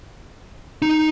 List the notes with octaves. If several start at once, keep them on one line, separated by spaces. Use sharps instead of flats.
D#4